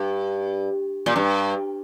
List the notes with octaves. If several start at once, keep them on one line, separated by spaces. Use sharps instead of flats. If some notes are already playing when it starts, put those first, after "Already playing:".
Already playing: G2
A#2
G2